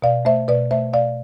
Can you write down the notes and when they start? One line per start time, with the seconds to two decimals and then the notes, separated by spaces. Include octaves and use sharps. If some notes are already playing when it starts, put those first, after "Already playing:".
0.02 B2 D5 F5
0.25 A3 C5 E5
0.48 B2 B4 D5
0.71 A3 C5 E5
0.93 B2 D5 F5